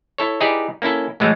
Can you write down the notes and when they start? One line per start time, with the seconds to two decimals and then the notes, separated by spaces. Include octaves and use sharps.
0.18 E4 A4 C#5
0.41 D#4 E4 G4 G#4 B4 D5
0.82 A#3 C#4 E4 A4
1.20 A2 E3 F#3 G#3 A3